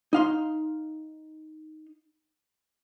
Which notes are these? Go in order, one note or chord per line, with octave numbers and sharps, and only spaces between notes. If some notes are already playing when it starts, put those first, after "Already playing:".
D#4 F5 C6